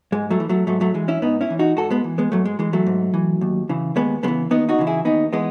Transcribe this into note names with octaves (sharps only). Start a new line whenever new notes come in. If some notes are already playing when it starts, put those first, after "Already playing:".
G#2 G#3
F#3 A3
E3
F#3 A3
G#2 F#3 A3
F#3 A3
E3 G#3
C#4 E4
G#2 B3 D#4
C#4 E4
E3
D#4 F#4
G#2 F#4 A4
G#3 B3
E3
G#3 B3
G#2 F#3 A3
G#3
E3 G#3
F#3 A3
G#2
E3
D#2
C#3 E3
D#2 G#3 B3
C#3 G#3 B3
E3
D#2 B3 D#4
D#4 F#4
C#3 E3
E4 G#4
D#2 B3 D#4
E3 G#3 B3